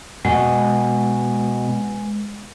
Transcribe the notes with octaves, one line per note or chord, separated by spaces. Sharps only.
B2 G#3